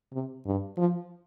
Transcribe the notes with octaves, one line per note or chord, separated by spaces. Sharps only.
C3
G2
F3